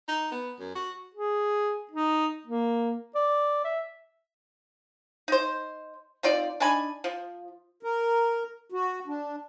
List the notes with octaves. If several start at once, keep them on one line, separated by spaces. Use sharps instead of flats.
D#4
B3
F#2
F#4
G#4
D#4
A#3
D5
E5
D#4 C5
C4 D#4 F4 D5
D4 D#4 G#5 B5
F3
A#4
F#4
D4